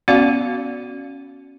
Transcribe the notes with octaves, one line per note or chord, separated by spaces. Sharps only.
B3 C#4 F#4 D5 F5